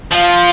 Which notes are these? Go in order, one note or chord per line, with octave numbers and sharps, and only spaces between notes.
F3 F5